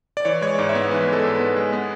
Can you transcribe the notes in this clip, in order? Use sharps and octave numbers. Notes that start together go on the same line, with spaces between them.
D5
E3 C#5
G#3 C#5
D5
G#2
E5
B3
E3 B4
G#3 A4
G#2
B4
B3
G#3
B3